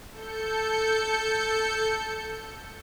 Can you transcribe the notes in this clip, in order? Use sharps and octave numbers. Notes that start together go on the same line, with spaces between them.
A4 G6 C#7